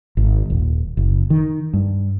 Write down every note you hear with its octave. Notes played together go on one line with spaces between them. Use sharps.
G#1
D#1
F#1
D#3
G2